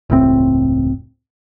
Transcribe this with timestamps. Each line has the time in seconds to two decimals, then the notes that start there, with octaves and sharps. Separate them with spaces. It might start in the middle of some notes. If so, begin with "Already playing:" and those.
0.10 E1 C#2 A2 C4